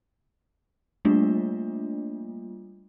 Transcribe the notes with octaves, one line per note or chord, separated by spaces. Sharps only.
G3 A3 A#3 D4 F4